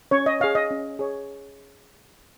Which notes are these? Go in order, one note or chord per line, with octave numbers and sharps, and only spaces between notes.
C#4 C#5
D#5
G#4 C#5 F5
D#5
C#4
G#4 C#5